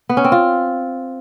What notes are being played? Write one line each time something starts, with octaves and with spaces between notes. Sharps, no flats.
B3
C#4
C4
F4